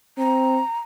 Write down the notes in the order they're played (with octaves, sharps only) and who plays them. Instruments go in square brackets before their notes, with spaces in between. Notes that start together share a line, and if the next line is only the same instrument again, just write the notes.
[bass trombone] C4 [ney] A#5